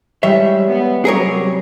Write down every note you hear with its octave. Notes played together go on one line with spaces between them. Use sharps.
G3 G#3 G4 C#5 E5
B3
C3 F#3 G3 G#4 A#4 C#5 E6